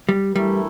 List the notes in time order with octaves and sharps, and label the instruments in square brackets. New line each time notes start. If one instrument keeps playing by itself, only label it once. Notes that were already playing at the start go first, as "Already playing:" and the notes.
[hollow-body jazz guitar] G3
[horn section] G2 E3 A3 E4 A#4 [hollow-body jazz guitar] G3